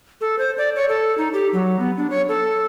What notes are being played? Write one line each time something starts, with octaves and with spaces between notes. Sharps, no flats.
A4
C5
D5
C#5
A4
D#4
G4
F#3
B3
D4
C#5
A4